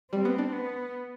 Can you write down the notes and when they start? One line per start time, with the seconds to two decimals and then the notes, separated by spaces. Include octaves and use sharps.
0.12 G3 C4
0.25 B3
0.38 D4
0.52 B3